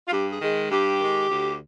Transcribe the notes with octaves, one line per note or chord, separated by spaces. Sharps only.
F4
G2 G4
G#4
D#3 G#3
G2 G4
D#3 G#3
D2